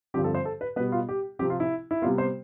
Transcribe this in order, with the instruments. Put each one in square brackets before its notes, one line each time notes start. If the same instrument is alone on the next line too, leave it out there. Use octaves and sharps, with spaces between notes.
[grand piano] G2 D3 F3 C4 G4
A4
C5
A4
B4
B2 G3 B3 B4
F4
G4
C3 F3 C4 G4
F4
E4
E4
C3 G3 B3 F4
C5